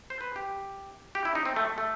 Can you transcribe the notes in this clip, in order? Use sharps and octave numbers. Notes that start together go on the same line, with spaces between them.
C5
B4
G4
G4
E4
D#4
C4
A3
A3